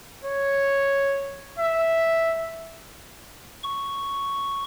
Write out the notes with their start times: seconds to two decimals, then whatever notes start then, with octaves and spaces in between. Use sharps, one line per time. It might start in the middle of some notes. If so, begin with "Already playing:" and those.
0.24 C#5
1.59 E5
3.63 C#6